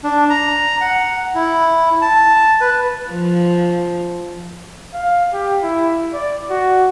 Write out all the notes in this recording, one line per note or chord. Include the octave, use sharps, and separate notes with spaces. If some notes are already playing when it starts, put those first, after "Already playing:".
D4
A#5
F#5
E4
A5
B4
F3
F5
G4
E4
D5
F#4